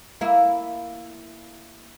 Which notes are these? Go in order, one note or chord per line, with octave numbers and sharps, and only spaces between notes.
A#3 E4